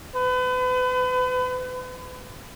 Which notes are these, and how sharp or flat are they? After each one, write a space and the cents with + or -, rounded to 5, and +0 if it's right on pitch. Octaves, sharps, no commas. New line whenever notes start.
B4 +35